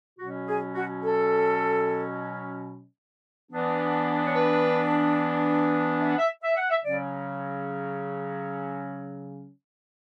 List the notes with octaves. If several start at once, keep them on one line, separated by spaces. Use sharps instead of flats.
B2 F#3 C#4 F#4
G#4
F#4
A4
E3 B3 D4
C#5
B4
E5
F#5
E5
E5
F#5
E5
C#3 F#3 C#4 D5